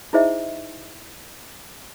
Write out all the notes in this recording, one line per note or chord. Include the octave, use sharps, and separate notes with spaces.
D#4 E4 G#4 C5 D#5 E5